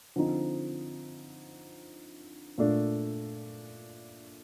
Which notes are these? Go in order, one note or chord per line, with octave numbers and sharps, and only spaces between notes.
D3 F3 C4 D#4
A#2 A3 D4